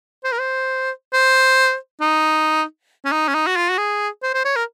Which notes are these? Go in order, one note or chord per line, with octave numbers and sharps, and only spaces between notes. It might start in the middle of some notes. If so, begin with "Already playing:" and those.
C5
A#4
C5
C5
D#4
C#4
D#4
C#4
D#4
F#4
F4
F#4
G#4
C5
C5
C#5
A#4